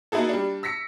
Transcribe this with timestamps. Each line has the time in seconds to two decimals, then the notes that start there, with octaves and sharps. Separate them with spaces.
0.12 A#3 D#4 E4 F#4 G#4 A4
0.29 G3 D4
0.63 E6 A#6 B6 C#7